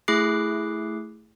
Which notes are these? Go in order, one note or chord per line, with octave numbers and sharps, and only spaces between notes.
A3 E4 G#4 D6 F#6 C7